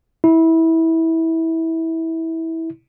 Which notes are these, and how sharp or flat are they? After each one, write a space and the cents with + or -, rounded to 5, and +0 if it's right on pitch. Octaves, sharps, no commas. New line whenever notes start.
E4 -20